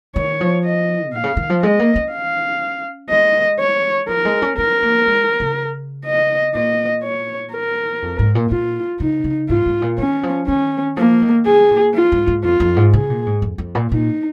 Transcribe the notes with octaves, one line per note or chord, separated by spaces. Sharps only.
D#3 C#5
F3
D#5
A#2 F5
C#3
D#3
F3
G#3 D#5
A#3
C#4
F5
G#3 D#5
C#5
F3 A#4
G#3
C#4
C#4 A#4
A#3
G#3
C#3
D#5
A#2 D#5
C#5
A#4
F2
G#2
A#2
A#2 F4
C#3 D#4
C#3
G#2 F4
G#2
A#2
D#3 C#4
F3
D#3 C#4
F3 A#3
D#3
C#3 G#4
A#2
F4
G#2
G#2
F2 F4
F2
G#2
C#3 G#4
A#2
G#2
F2
F2
A#2
A#2 D#4